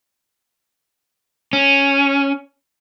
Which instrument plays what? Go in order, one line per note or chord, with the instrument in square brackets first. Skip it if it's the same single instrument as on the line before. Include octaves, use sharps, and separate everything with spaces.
[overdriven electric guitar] C#4